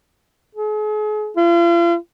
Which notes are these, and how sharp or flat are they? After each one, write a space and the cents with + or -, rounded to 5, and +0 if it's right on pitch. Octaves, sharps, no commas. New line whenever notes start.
G#4 +40
F4 -40